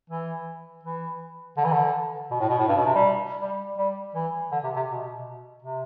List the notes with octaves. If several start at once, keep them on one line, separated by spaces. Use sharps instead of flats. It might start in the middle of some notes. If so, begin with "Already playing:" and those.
E3
E3
D3
E3
D3
B2
A2
B2
A2
G2
B2
C3
G3
G3
G3
E3
D3
C3
C3
B2
C3